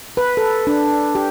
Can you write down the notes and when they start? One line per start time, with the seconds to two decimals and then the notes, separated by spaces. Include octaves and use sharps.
0.17 B4
0.37 A4
0.67 D4
1.15 G4